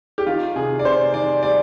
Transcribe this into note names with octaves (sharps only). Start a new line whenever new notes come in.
G4
D#3 F4
C3 G#4
D5
C3 C5
D#3 D5
G3 D5